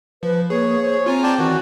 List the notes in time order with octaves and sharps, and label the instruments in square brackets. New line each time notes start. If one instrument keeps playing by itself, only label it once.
[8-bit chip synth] F3 [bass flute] B4
[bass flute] A#3 [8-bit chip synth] G#4 [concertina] C#5
[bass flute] C5 [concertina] C#5
[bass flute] C4 [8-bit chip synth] F4 G#5 A#5
[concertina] D5 G5 A5
[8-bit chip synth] D#3 E3 [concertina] F#4